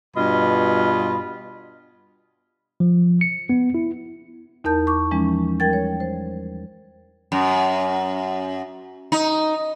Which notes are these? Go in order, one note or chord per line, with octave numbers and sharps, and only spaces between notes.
G2 B2 F4 D#5 B5
F3
C#7
B3
E4
E2 D#4 A#4 A5 G6
C#6 D6
E3 F3 G#3 C#4
G3 A#4 G5 G#6 A6
C#5
C5
F#2
D#4